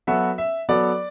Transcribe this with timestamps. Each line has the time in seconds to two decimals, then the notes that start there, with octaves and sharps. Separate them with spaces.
0.07 F#3 B3 F#4 A4 E5
0.38 E5
0.69 F#3 B3 F#4 A4 D5